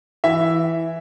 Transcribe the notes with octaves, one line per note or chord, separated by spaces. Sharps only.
E3 E5